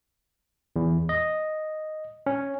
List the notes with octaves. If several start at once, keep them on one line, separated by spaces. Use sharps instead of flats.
E2
D#5
C#4